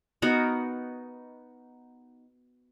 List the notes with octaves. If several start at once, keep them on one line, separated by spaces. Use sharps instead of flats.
B3 D#4 F#4 A#4